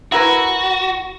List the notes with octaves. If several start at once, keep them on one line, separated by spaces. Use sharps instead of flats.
E4 F#4 A#4 B4